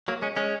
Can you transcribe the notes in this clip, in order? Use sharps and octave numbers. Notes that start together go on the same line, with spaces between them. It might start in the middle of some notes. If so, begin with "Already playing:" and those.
F#3 A#3
G#3 C#4
G#3 C#4